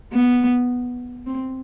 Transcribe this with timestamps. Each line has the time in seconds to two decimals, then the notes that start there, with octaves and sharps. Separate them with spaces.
0.13 B3
1.26 C4